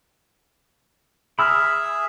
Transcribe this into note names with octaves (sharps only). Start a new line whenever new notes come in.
G#4 E5 B5 E6 F6